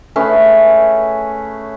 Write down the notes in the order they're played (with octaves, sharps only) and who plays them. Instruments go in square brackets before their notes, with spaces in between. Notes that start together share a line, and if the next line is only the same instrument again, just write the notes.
[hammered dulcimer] A3 C#4 G#4 B4